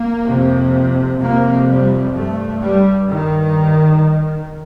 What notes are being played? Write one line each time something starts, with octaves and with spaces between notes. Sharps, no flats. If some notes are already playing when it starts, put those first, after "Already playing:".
Already playing: A#3
F2 C3
F2 C3 A#3
G3
G2 A3
G3
G2 D#3